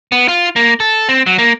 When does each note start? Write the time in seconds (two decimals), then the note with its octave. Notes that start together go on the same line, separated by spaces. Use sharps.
0.12 B3
0.28 F4
0.56 A#3
0.80 A4
1.09 C4
1.26 F#3
1.38 A#3